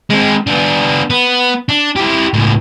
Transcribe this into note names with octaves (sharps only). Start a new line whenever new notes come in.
G#3 C4
B3 D4
B3
D4
E4 G4
C#2 A2